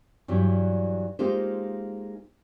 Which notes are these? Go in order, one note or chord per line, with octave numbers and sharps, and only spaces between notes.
G2 E3 F#3 G3
G#3 A#3 D#4 F4 G4 C5